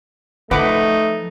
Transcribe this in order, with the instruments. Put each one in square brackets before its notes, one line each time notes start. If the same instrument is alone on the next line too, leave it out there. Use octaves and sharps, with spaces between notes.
[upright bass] F3 [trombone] A3 [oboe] D#4 [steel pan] B4 F#5 D6